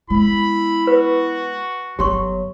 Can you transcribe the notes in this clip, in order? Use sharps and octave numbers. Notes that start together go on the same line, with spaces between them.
G#3 B3 E4 B5
F#4 B4
G1 F#3 B3 G4 C6 C#6